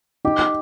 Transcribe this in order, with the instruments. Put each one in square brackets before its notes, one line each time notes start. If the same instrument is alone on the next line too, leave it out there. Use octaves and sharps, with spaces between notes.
[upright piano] D#4 [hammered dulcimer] G4